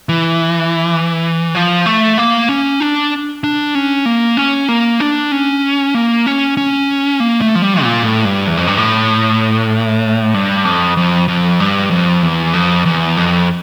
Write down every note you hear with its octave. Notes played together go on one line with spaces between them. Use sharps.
E3
F3
A3
A#3
C#4
D4
D4
C#4
A#3
C#4
A#3
D4
C#4
A#3
C#4
C#4
A#3
A3
F3
G3
A#2
A2
G2
E2
F2
G2
A2
G2
F2
F2
F2
G2
F2
E2
F2
E2
F2